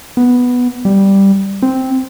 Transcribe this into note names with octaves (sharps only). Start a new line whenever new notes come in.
B3
G3
C4